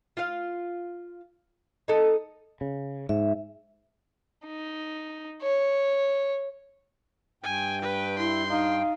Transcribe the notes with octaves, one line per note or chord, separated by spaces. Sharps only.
F4 F5
D#4 A4
C#3
G#2 E5
D#4
C#5
G2 G5 G#5
B4
E4 C6
D#4 F5